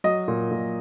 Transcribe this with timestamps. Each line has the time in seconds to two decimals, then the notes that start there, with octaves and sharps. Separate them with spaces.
0.04 F#3 D#5
0.28 A#2
0.51 A#2